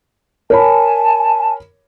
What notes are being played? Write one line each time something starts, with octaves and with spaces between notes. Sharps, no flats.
A#4 C#5 G#5 A5 B5